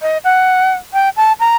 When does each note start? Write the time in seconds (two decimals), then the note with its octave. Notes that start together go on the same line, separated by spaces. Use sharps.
0.02 D#5
0.24 F#5
0.93 G5
1.17 A5
1.40 A#5